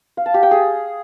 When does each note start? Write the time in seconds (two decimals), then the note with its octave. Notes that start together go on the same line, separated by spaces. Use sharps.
0.17 F5
0.26 A5
0.34 G4
0.43 G5
0.51 G#4